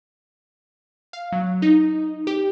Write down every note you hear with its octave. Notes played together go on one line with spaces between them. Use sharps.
F5
F#3
D#4
G4